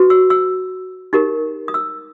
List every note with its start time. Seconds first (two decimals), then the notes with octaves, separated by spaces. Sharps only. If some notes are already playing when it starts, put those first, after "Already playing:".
Already playing: F#4 B4
0.10 E6
0.30 E6
1.13 D#4 G4 A#4
1.68 D#6
1.74 E6